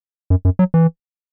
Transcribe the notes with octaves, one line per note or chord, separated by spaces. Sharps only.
F#2
F#2
F#3
E3